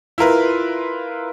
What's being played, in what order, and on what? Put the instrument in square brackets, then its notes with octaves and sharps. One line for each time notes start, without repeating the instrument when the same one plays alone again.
[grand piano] E4 F4 A#4 B4